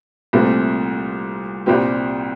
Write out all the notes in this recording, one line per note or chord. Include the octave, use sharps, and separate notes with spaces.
C2 A#2 A3 C4
C2 A#2 G3 C4 G4